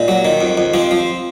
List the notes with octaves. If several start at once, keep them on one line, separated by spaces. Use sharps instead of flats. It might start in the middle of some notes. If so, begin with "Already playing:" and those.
Already playing: A#2 D#4
F#3
D#3
F2
F2
F3 C4
F3